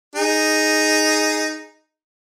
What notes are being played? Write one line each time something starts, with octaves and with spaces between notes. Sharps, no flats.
D#4 G#4